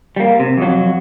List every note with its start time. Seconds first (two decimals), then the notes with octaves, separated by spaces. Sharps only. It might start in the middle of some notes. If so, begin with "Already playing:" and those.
0.16 G3 A#3
0.40 C3
0.57 F2 F#3